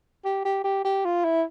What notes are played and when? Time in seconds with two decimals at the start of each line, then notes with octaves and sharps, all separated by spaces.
0.25 G4
0.45 G4
0.64 G4
0.84 G4
1.05 F4
1.24 E4